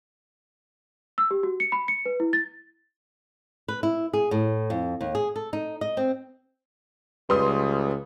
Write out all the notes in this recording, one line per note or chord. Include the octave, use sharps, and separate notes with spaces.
E6
G4
F#4
C#7
B5
C#7
B4
E4
A6
B4
E4
G#4
A2
F2
D#2
G#4
A4
D#4
D#5
C4
C#2 G3 B4 C6 D#6